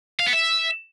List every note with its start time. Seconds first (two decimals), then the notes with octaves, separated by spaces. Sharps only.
0.20 F5
0.26 B3
0.33 E5